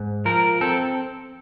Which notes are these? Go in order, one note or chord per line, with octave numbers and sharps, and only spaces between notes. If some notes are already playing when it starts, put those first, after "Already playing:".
Already playing: G#2
F3 A#4
C4 A4